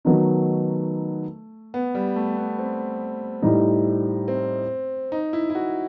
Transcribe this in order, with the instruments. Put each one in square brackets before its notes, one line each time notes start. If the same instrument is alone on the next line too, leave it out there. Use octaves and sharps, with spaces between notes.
[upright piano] D#3 F#3 B3 D#4 [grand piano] A3
[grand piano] B3
G3
A3
B3
C4
[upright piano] A2 G3 D#4
[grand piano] C4
D#4
E4
E4
F#4